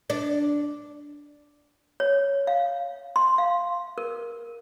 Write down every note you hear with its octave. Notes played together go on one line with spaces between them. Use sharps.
D4
C#5
F5
C6
F5
A#4